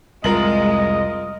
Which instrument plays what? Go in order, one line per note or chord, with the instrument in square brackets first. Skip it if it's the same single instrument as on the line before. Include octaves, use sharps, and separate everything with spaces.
[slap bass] C2 F2 [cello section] G#3 [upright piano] F4 A#4 F#7 [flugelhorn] D#5